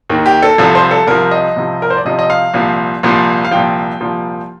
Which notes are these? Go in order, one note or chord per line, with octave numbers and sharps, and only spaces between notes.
D#2 D#3
G4
A4
C2 C3 F3 A4
C5
A4
C2 C3 F3 A#4
D#5
C2 C3 F3
A#4
C5
D5
C2 C3 F3 D#5
D#5
F5
C2 A#2 F3
C2 A#2 F3
F5
C2 A#2 F3 G5
C2 A#2 F3